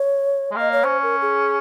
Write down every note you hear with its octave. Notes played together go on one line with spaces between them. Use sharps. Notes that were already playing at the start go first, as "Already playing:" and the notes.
Already playing: C#5
G#3
A#3 D#5
C#5
C#4 C5
A#4
G#4